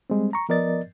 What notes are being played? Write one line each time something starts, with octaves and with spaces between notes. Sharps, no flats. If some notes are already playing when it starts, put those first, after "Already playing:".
G3 G#3 C4
A#5 C#6
F3 B3 A#4 D5 D#5 A6